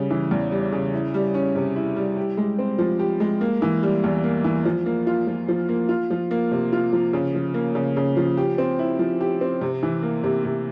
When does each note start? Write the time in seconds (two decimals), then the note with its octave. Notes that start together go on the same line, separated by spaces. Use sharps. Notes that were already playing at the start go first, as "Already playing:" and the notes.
Already playing: C#3 G3
0.10 E3
0.31 E2
0.52 G3
0.72 C#3
0.94 E4
1.14 G3
1.34 C#4
1.55 C3
1.76 E4
1.96 G3
2.16 G4
2.37 G#3
2.59 C4
2.78 F3
2.99 G4
3.20 G#3
3.41 A#3
3.62 E3
3.83 G3
4.04 E2
4.24 A#3
4.44 E3
4.65 F3
4.86 A#3
5.07 F4
5.27 F3
5.48 F3
5.69 A#3
5.89 F4
6.10 F3
6.31 A#3
6.51 C3
6.73 F4
6.93 F3
7.13 C#3
7.35 F3
7.54 A#3
7.75 C#3
7.97 C#3
8.17 F3
8.37 G4
8.58 C4
8.79 E4
8.99 F3
9.21 G4
9.41 C4
9.61 C3
9.83 E3
10.03 A#3
10.24 C3
10.45 C3